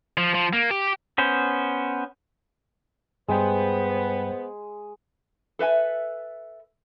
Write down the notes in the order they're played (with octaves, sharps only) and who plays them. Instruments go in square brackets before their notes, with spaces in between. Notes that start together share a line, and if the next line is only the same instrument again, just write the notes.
[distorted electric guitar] F3
F3
A#3
G4
[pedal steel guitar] B3 C#4 C5
[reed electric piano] G2 G3 G5 [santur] G#3 [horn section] B3 [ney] C5
[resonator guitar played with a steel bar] A4 B4 E5 G#5